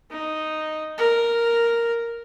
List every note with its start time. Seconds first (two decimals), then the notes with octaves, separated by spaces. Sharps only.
0.11 D#4
0.98 A#4